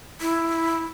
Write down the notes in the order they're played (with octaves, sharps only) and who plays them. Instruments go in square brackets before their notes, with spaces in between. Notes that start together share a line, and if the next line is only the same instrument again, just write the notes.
[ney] E4